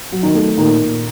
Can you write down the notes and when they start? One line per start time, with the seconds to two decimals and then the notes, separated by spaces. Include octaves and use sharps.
0.12 F#3
0.23 D#3 D#4
0.35 A3
0.57 A#2 D#3 D#4
0.81 A#2